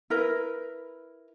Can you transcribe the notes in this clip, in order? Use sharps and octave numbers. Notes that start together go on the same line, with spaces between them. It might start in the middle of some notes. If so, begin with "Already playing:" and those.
E4 A#4 B4